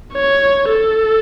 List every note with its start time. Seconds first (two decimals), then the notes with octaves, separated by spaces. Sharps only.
0.13 C#5
0.69 A4